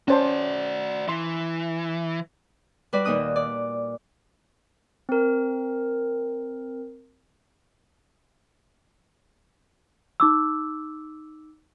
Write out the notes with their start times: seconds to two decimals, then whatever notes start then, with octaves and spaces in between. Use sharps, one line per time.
0.08 C#4 F#4 C5 D5 A5
1.08 E3 E5 C6
2.93 G3 F#4 B4 D5
3.04 D#2 A#2 D#4 D#6 F#6
3.36 D5
5.09 C4 A#4
10.20 D#4 D6 E6